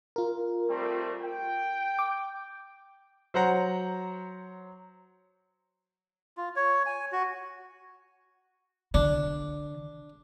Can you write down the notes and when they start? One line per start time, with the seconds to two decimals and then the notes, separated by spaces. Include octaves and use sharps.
0.16 F4 A#4
0.69 G3 A3 C4
1.22 G5
1.99 D6
3.34 F#3 C5 F#5 A#5
6.37 F4
6.56 C#5
6.86 G#5
7.12 F#4
8.94 D3 D4